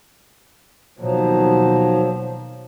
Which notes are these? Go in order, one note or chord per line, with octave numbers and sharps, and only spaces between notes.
D#2 B2 F3 F#3